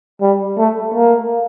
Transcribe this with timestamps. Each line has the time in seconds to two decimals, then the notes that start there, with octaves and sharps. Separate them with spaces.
0.21 G3
0.58 A3
0.94 A#3